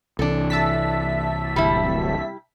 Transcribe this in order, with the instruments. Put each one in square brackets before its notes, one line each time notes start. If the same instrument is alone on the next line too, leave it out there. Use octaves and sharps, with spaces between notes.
[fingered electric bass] C2 E3 [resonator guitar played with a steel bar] D4 A4
[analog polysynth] E5 A5 B6
[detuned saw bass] D1 [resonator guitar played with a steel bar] G3 E4